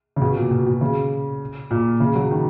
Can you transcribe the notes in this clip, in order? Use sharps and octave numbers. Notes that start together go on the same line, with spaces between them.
C#3
B2
A#2
B2
B2
C#3
A#2
C#3
F#3
D#3